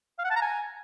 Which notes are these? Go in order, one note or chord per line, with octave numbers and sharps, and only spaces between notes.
F5
F#5
A5
A#5
G#5